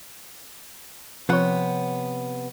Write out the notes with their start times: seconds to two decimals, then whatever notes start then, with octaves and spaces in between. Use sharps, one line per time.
1.29 C3 F3 B3 C#5 F#5